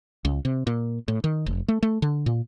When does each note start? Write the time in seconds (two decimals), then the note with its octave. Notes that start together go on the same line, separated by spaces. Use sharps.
0.25 C#2
0.45 C3
0.67 A#2
1.08 A2
1.24 D#3
1.46 F1
1.68 A3
1.83 A3
2.02 D3
2.26 A#2